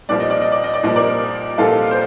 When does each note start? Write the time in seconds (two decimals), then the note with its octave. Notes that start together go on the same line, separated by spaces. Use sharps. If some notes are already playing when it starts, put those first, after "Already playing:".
0.09 C2 A#2 F3 A#3 D5
0.20 D#5
0.30 D5
0.42 D#5
0.52 D5
0.64 D#5
0.74 D5
0.83 C2 A#2 F3 A#3 D#5
0.95 A#4 D5
1.58 C2 A#2 F3 A#3 F4 A4
1.91 C5